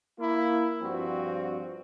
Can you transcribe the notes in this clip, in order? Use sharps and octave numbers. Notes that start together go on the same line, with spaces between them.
A#3 E4
G2 F3 C4 F#4